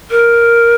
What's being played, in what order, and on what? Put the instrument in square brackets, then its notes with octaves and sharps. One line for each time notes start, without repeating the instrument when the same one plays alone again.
[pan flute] A#4